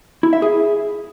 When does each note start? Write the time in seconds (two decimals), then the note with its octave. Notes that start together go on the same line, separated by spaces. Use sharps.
0.23 E4
0.33 E5
0.42 G#4